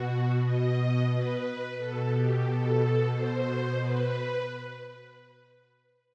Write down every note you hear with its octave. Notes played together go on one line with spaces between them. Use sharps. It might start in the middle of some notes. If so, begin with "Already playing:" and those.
Already playing: B2 F#4
D#5
B4
B2 A4
G4
A4
C5
B4